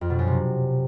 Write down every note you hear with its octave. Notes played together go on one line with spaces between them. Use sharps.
F2
B2
F#2
C3